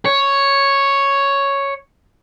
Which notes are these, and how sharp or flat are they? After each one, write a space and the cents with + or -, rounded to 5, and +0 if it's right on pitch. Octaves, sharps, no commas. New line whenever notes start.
C#5 +0